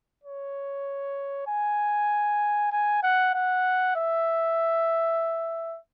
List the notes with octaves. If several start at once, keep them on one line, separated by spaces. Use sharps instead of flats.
C#5
G#5
G#5
F#5
F#5
E5